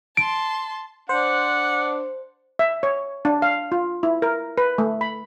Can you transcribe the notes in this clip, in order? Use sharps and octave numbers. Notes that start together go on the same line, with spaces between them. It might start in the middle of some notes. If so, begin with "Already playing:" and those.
A5 C6 D7
D4 C5 F#5
E5
C#5
D4
F5
F4
E4
A#4
B4
A3
B5